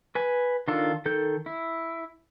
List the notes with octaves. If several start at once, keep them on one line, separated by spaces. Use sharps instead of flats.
B4 G#5
D#3 D4 F4 A4
D#3 A4 G6
E4